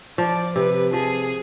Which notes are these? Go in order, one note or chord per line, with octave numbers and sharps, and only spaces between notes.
F3 D5
C3 B4
F3 G#4